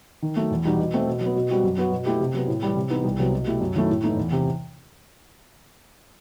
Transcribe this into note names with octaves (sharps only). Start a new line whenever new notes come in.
D#3
F#3 A3
E2
B2 G3 D#4 F#4
B2
A3 C4
B2
F#3
B3
B2
G3 C4 F#4
F#2
F#3 B3 F#4
B2
A3 E4 G4
C3
F#3 B3
A2
E3 G3
C3
E3 B3 D#4
C2
C3 F#3 B3
B2
A3 E4 G4
F#2
D#3 F#3 A3 E4
A2
E3 A3 D#4
E2
C3